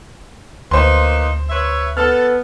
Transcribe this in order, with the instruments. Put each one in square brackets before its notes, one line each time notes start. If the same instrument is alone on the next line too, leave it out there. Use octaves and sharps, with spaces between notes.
[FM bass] D2 [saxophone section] A#3 D#4 B4 [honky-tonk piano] C5 C6
[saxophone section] B4 C#5 E5
[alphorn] B3 [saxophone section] A4 [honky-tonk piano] F6